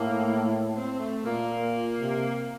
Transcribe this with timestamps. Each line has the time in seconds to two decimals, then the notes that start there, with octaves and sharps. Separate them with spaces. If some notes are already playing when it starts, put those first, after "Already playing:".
Already playing: A2 A#3
0.76 C4
1.00 A3
1.25 A#2 A#3
2.00 C3